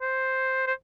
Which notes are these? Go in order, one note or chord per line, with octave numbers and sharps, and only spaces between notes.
C5
C5